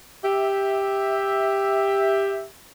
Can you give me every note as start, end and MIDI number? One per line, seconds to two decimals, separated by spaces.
0.24 2.44 67
0.24 2.44 76